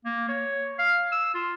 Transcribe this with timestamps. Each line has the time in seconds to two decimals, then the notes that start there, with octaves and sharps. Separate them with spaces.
0.05 A#3
0.28 C#5
0.79 F5
1.12 E6
1.34 F4